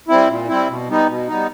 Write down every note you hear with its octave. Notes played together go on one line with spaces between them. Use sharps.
G3 C4 E4
A#2
G3 C4 E4
B2
G3 B3 D#4
B2
G3 B3 D#4